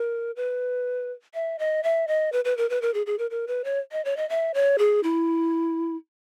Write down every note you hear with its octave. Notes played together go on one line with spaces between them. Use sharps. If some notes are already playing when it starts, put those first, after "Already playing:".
Already playing: A#4
B4
E5
D#5
E5
D#5
B4
B4
A#4
B4
A#4
G#4
G#4
A#4
A#4
B4
C#5
D#5
C#5
D#5
E5
C#5
G#4
E4